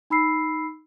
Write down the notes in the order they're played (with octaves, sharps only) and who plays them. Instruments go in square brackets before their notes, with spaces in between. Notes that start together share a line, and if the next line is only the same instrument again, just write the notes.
[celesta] D#4 B5 E6 C7